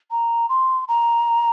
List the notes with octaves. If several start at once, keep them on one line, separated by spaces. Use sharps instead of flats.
A#5
C6
A#5